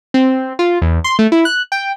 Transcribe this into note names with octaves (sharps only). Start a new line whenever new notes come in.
C4
F4
E2
C6
A3
E4
F#6
G5